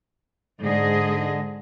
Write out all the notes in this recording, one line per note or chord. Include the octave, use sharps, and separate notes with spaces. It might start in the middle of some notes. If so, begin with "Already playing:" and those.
G#2 D3 G#4 D#5